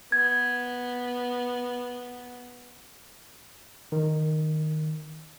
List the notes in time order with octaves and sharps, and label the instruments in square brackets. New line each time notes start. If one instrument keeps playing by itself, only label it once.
[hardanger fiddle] B3 [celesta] G#6
[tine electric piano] D#3